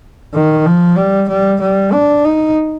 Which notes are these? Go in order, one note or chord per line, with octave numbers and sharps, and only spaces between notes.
D#3
F3
G3
G3
G3
D4
D#4